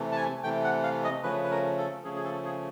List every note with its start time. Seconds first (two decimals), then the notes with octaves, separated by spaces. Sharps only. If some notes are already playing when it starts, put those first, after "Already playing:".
Already playing: C3 E3 A3
0.12 A5
0.16 G#5
0.43 C3 E3 A3 G5
0.64 F#5
0.84 F5
1.04 D#5
1.23 C#3 F3 A3 C#4 B4
1.44 B4
1.51 A#4
1.78 A4
2.04 C#3 F3 A3 C#4 G#4
2.16 G#4
2.24 A4
2.45 G#4